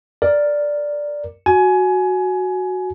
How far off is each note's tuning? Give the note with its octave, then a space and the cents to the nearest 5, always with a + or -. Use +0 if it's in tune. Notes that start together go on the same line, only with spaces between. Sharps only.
A#4 +0 D5 +0
F#4 +0 G#5 +20